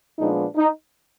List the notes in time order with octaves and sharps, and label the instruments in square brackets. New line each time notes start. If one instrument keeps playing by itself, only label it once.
[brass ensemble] A#2 F3 G#3 B3 D4 D#4
D#4